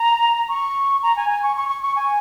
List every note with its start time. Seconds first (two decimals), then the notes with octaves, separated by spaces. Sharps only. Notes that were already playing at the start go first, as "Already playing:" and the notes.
Already playing: A#5
0.49 C#6
1.03 A#5
1.16 G#5
1.30 G#5
1.42 C#6
1.57 C#6
1.69 C#6
1.82 C#6
1.96 G#5